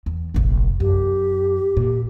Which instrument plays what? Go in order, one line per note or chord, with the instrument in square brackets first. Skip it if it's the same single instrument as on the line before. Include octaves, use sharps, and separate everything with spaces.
[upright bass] E2
F1 A#1
[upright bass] F#2 [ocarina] G4
[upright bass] A#2